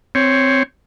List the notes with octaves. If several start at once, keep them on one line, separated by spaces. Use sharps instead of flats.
C4 C#5